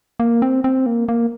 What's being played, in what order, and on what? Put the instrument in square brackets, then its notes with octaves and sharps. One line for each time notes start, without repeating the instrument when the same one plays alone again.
[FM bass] A#3
C4
C4
A#3
A#3